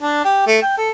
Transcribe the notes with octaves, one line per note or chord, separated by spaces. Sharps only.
D4
G4
A3
G5
A4